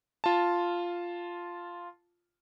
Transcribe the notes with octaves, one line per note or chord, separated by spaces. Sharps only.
F4 A5